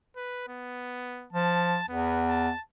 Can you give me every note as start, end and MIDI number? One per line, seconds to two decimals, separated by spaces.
0.16 0.44 71
0.48 1.28 59
1.33 1.78 53
1.33 1.85 81
1.89 2.49 40
1.89 2.22 59
2.28 2.61 81